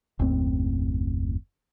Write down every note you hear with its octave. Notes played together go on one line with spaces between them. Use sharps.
F#1 D#2 A2 C4